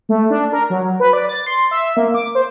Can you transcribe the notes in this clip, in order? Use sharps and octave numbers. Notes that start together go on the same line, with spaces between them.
A3
D4
A#4
F#3
B4
D5
A6
C6
E5
A#3
D6
C5